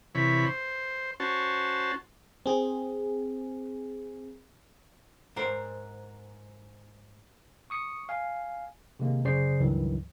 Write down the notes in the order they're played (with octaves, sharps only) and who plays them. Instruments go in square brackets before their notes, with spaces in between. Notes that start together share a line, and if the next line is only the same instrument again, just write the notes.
[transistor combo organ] C3 E3 C#5 B5
C5
C#4 F#4 C5 A5
[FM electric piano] C4 G#4
[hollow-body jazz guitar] G#2 A#4 C5
[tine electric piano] C#6 D#6 C#7
F5 G#5
C3 D#3 G#3 A#3
F#2 C#3 G#4 C5 D5 C7
C#2 G2 D#3 E3 F#3